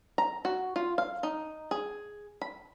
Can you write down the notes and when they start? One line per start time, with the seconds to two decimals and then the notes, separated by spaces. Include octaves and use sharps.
0.18 A#5
0.45 F#4
0.76 F4
0.98 F5
1.23 D#4
1.71 G#4
2.42 B5